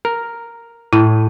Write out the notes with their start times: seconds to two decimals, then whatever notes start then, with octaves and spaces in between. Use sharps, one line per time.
0.05 A#4
0.93 A2 E4